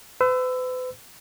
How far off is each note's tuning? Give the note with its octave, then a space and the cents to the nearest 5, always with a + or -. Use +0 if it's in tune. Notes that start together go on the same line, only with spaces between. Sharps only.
B4 +45 E6 +5